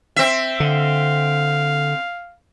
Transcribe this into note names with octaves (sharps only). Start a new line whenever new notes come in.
C4 E5
D3 F5